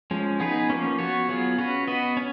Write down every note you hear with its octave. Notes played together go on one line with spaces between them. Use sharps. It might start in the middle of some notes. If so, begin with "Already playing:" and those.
F3 G#3 C#4
B3 D#4 G#4 B4
F3 A#3 C#4
B3 F#4 C#5
F#3 B3 F4 G#4
C#4 F#4 B4
B3 F#4 B4 D#5
C#4